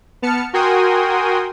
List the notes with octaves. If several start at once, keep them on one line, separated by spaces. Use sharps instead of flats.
B3 A5 F6 C#7
F#4 A#4 G5 G#5 C6 D#6